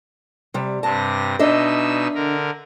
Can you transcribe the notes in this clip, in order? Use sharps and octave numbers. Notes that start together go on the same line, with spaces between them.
C3 G3
G2 C3 A5 A#6
B2 D4 D#4 D#5 E5 E6
D3 A#4